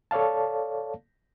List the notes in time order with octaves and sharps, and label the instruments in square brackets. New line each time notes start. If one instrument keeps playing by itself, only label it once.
[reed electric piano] A4 C#5 D5 F5 A5